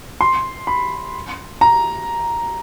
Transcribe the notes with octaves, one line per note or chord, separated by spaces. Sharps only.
C6
B5
A#5